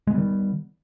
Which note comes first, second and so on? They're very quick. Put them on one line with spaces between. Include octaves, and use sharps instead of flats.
G#3 B3 G3 D#3